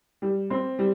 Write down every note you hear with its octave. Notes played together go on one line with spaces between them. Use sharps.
G3
C4
G3